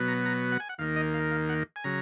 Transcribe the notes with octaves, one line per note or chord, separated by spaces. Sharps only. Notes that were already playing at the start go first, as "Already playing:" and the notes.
Already playing: B2 F#3 B3
A#5
A#5
F#5
G#5
F#5
D#2 D#3 A#3 F5
D#5
F5
F5
F#5
G#5
C#3 F#3 A#5